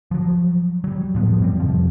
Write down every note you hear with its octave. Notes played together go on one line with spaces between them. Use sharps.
F3 F#3
F#3 G3
A2 F3 B3
F#2 G3 C4
F2 C3 F3